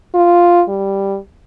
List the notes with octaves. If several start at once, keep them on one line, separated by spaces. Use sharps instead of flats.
F4
G3